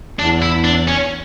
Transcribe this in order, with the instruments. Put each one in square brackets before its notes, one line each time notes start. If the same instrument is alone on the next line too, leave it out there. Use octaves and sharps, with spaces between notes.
[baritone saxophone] E2 [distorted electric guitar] D4
[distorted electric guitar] E4
D4
C#4